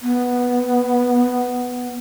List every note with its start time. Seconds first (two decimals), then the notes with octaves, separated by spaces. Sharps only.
0.02 B3